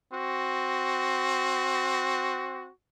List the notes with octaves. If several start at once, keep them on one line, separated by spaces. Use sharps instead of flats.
C4 F#4